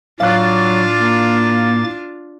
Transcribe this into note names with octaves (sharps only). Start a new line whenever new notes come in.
A2 F#3 D4 F4 F5 D6 F#6 A6
A#3